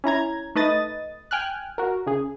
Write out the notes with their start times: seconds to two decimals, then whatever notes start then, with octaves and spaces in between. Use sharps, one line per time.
0.04 C#4 E4 A#5 G#6
0.55 A3 D#4 B4 D#5 D#6 A6
1.31 G5 G#5 F6 F#6
1.78 F#4 A#4
2.07 C#3 G#4